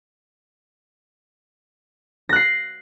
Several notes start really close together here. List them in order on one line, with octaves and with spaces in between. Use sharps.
A#6 F#6 C7